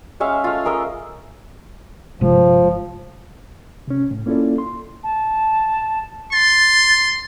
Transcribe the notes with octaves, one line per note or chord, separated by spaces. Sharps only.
G#3 C#4 E5 F5
A3 F4
G#4 A#4 D#5 E5
G1 C3 F3 G#3
C3 C#4
A2
A#3 C#4 E4 F4 A4 D5
C6
A5
C6 A6